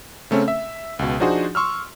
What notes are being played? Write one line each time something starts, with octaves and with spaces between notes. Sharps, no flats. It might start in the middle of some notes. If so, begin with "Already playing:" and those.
C#3 A3 C4 C#4
E5
C#2 B2
F3 D4 D#4 F#4 G#4 C5
C6 C#6 E6 F6